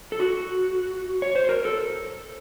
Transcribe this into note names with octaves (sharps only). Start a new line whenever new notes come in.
A4
F#4
C#5
C5
A#4
A4